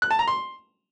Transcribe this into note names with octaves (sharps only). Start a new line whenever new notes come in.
F#6
A5
A#5
C6